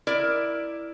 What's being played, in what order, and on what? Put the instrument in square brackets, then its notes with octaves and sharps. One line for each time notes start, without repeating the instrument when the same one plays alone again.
[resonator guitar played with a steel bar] E4 A#4 D5